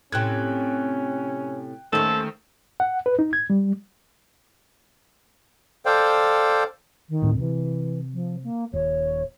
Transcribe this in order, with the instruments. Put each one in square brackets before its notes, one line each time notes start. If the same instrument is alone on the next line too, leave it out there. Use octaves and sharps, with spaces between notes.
[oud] A2 C3 [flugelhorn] C#4 [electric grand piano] G5 F#6 G#6
[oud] D#2 C#4 [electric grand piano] D#3 A3 [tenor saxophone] A4 [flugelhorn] C5
[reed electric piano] F#5
B4
D#4
G#6
G3
[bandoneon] A4 C5 D5 F5 G5
[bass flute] D#3
[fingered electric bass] D2 A2 C4
[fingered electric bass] C3 [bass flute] E3
[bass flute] F3
A#3
[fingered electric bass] D#1 [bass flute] C#5